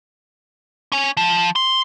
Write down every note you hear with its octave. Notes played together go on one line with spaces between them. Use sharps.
C#4 G#5
F3
C6